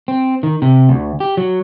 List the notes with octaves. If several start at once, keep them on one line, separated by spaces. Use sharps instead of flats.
C4
D#3
C3
D2
G4
F#3